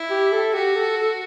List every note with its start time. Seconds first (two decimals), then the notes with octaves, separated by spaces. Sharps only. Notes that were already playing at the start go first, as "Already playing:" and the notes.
Already playing: E4
0.10 G4
0.32 A4
0.54 F#4 G4
0.76 A4
0.97 A4